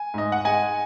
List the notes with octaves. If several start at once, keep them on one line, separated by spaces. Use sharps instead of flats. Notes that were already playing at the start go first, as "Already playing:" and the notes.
Already playing: G#5
G#2 D#5
F#5
G#3 D#5 G#5